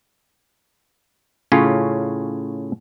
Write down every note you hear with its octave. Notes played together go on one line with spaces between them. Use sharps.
A2 C#3 C#4 F4